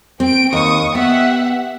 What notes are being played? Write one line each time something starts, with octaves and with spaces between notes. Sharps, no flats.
C4 G5 D7
D#2 C#6 D#6
B3 G4 E5 F#5